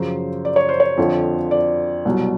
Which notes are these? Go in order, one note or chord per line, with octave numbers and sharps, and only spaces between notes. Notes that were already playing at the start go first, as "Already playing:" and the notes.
Already playing: F#2 C#3 F3 C5
D5
C#5
C5
C#5
F2 D3 F3
D5
C2 B2 F#3